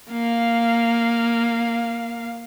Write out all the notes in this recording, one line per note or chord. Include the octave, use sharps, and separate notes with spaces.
A#3 F5